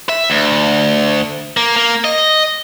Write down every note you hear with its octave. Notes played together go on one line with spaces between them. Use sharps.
E5
D2
A#3
A#3
D#5